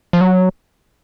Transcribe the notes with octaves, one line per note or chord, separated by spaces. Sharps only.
F3
F#3